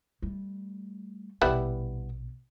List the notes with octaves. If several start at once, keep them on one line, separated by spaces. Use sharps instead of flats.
G3 A3
A#1 B2 G3 B3 E4